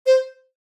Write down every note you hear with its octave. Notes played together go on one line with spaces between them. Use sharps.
C5